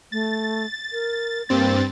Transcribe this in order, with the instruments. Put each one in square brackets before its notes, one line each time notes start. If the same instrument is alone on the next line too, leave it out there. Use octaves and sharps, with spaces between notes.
[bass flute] A3 [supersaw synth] A6
[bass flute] A#4
[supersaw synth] G2 C4 A6 [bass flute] A#3